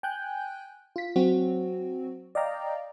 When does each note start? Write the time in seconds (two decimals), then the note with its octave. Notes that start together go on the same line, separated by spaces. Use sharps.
0.03 G5 G#5 F#6 G6
0.96 F4 B6
1.16 F#3 C4 F#4
2.35 D5 D#5 F5 G5 A#5